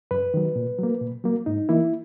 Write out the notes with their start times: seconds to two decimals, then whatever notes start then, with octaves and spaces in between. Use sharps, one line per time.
0.11 F#2 B4
0.34 D#3 F#3
0.56 A#2
0.79 F#3 A#3
1.01 A#2
1.24 F#3 A#3
1.46 G#2 D#4
1.69 E3 A#3 E4